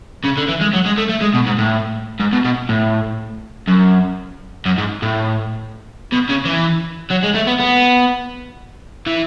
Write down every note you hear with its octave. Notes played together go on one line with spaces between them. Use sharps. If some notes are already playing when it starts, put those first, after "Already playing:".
C#3
D3
E3
G#3
F#3
G#3
A3
A3
G#3
B2
G#2
A2
G#2
B2
B2
A2
F#2
F#2
G#2
A2
B2
C#3
E3
F#3
G#3
A3
B3
B3
E3